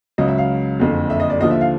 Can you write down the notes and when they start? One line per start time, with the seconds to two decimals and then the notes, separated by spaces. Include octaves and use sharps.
0.18 C#2 C#3 F#3 D#5
0.28 E5
0.38 F5
0.79 F#1 F2 D3
1.10 E5
1.20 D#5
1.30 D5
1.40 D#2 D3 F3 D#5
1.51 E5
1.61 F5